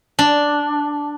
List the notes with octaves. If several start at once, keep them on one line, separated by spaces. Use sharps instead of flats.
D4